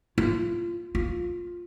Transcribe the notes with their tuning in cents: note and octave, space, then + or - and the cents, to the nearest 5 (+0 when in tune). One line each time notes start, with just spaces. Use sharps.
F4 -25
F4 +10